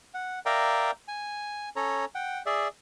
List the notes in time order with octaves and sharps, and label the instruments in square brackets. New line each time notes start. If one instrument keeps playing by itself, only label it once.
[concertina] F#5
A#4 D5 E5 F5 G5 A#5
G#5
C#4 A4 C#5 A#5
F#5 G5
G#4 D5 E5